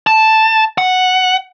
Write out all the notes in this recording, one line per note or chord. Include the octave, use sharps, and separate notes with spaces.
A5
F#5